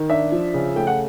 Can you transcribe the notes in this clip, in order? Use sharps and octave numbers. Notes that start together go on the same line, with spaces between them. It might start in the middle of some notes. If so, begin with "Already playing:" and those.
Already playing: D#3
D4 E5
F3
C#3
A3 G5
F#5